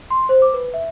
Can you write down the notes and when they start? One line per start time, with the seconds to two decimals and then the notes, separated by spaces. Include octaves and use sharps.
0.11 C6
0.29 C5
0.42 D6
0.54 B4
0.74 E5